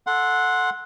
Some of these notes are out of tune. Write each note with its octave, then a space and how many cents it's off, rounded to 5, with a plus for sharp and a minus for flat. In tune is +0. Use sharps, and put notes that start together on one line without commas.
A4 +0 F#5 -10 C6 +0